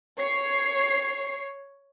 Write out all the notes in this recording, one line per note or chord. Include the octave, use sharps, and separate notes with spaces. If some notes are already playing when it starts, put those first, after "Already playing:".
C#5 C7